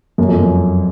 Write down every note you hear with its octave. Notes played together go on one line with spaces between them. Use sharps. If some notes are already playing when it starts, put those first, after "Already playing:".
F#2
F2
F#2